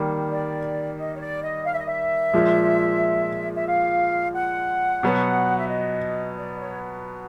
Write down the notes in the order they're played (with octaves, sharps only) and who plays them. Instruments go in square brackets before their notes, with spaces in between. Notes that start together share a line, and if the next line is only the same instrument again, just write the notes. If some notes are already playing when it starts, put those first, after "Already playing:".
Already playing: [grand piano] D#3 G3 A#3
[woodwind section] D5
D#5
C#5
D5
D#5
F5
E5
D#5
E5
[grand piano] A#2 F3 G#3
[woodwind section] E5
F5
F#5
[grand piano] B2 F#3 B3
[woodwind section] E5
D#5
D5
C#5